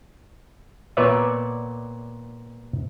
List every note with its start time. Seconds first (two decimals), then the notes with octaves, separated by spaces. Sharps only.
0.97 A#2 B3 B4 C#5 D5 E5